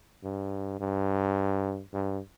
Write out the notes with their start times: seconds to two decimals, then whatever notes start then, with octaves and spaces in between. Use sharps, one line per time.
0.24 G2
0.80 G2
1.93 G2